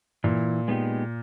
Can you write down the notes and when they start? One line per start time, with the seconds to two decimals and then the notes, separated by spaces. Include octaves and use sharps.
0.24 A#2 E3
0.68 G#3 B3 D#4 G4